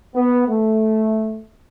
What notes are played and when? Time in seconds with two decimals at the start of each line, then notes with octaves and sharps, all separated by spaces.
0.16 B3
0.48 A3